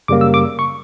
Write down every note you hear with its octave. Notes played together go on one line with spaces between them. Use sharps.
F#2 C#3 G3 A#3 D6
E6
D6
C#6